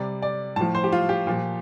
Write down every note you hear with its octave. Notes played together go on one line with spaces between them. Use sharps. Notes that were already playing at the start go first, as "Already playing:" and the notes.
Already playing: C3 G3 D5
D5
A2 F3 A5
C5
G4
F4
G4
A#2 F3